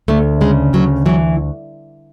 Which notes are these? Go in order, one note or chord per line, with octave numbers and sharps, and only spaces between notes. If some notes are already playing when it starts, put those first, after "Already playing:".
D2 A3
C#3 G#3
D2 F#3
E3 F#3